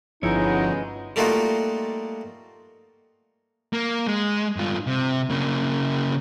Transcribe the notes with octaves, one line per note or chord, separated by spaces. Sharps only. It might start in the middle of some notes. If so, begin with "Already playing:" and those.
G1 F3 G#3 B3 C#4 D#4 E4 C#5
G3 A3 A#3 D#4 F4 F#4
A#3
G#3
G2 F4
C3
C#3 A#3